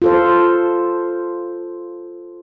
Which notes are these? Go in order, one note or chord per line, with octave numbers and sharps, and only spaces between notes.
F4 A4 C5